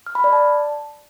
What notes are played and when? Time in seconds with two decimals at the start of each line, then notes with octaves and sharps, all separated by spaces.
0.07 F6
0.15 B5
0.24 D5
0.33 A5